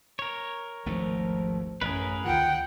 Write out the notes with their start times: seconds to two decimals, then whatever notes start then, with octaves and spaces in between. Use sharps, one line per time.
0.19 A#4 C#5
0.86 G#1 D2 F3 A3
1.81 A1 F#2 G#4 A#4 B4
2.25 D2 D#3 E3 F4 F#5 G5